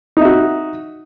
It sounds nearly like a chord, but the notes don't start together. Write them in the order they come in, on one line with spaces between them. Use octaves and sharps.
D#4 E5 F#4